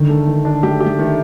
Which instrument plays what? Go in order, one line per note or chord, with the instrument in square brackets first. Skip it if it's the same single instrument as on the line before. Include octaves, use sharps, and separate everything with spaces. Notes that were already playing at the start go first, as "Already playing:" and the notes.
Already playing: [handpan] D3 [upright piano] D#3
[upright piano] A3
D#3
D4
[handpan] A3 [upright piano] G4
[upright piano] G4
[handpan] A3
[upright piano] D#3